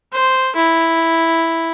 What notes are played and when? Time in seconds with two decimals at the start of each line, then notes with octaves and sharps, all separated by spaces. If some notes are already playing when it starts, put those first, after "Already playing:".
0.12 C5
0.56 E4